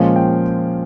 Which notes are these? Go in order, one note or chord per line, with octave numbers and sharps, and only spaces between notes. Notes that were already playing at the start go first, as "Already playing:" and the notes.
Already playing: A#2 F3 G#3 C#4 F5
G5